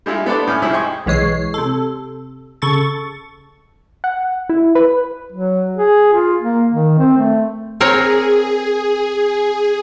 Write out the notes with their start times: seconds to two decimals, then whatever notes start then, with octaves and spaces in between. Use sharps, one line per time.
0.06 G3 G#3 E4 F4
0.26 B3 D4 A4 C5 D5
0.47 A2 C#4 F6
0.62 C2 G#2 F3 E4 G#4
0.73 D#5 G5 G#5 C6 C#6
1.06 B1 E3 G#3 C#5 C7
1.54 C3 A4
2.62 C#3 A4 C#6 A6
4.04 F#5
4.49 E4
4.75 B4
5.32 F#3
5.76 G#4
6.13 F4
6.41 A#3
6.72 D#3
6.98 C4
7.18 A3
7.80 C4 G#4 A#4 C#5